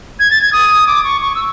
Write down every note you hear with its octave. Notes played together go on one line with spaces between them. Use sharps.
G#6
A6
G#6
D#6
D6
C#6
C#6
E6